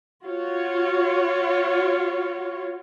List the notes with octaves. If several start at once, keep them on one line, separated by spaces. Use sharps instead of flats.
F4 F#4 C#5